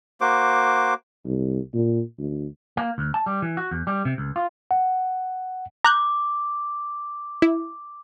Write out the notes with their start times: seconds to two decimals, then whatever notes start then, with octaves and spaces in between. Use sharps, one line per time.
0.21 A#3 F#4 C5 D6
1.26 C2
1.74 A#2
2.19 D2
2.77 A#3
2.98 D2
3.14 A5
3.26 G3
3.42 E3
3.57 F#4
3.71 E2
3.87 G3
4.05 C3
4.18 C#2
4.36 F4
4.71 F#5
5.85 A#5 D6 F#6 G6
7.42 E4